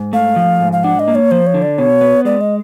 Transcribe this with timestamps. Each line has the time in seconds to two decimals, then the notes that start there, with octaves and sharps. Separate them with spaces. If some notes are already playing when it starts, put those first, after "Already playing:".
Already playing: G#2
0.13 A3 F5
0.36 F3
0.60 G#2
0.73 F5
0.84 D4 F#5
0.99 D#5
1.08 A#3
1.15 C#5
1.31 F3 C5
1.47 C#5
1.54 D3
1.62 D5
1.78 B2 C#5
2.01 B3
2.25 G#3 D5
2.41 D#5